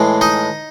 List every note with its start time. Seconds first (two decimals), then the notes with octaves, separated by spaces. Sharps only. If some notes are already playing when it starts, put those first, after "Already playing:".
Already playing: A2 E3 G#3
0.21 D#4 D#5